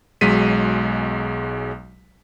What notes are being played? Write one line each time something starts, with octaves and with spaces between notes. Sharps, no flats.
B1 F#3 G#3 B6 D#7